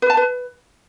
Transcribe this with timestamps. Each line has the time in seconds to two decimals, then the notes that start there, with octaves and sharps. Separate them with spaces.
0.02 B4
0.10 A5
0.17 B4